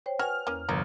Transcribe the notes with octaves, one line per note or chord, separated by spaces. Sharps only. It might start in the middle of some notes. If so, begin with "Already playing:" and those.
C5 C#5 G5
F#4 B4 C#5 G5 G#5 F6
E2 A#3 C#4
G1 C3 F3 A#4